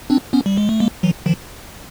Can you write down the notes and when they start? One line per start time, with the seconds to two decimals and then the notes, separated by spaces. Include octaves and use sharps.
0.10 C4 D4
0.33 B3 C#4
0.46 G3
0.57 G#3
0.69 A3
0.80 G#3 A#3
1.03 E3 F#3
1.26 D#3 F3